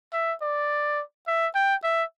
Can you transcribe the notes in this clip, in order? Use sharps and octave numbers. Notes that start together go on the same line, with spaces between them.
E5
D5
E5
G5
E5